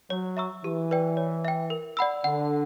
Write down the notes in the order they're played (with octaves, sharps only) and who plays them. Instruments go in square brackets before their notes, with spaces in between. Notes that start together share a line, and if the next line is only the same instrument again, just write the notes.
[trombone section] F#3 [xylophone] C#5
[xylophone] E5 A#5 C#6 E6
[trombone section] E3 [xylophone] G4
[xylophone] B4 D5 G5
C#5
E5 G5
A#4
D5 F#5 B5 E6
[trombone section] D3 [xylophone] F#5